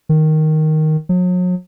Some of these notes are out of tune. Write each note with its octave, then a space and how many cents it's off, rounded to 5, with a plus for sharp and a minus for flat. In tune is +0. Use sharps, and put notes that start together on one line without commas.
D#3 +0
F#3 -40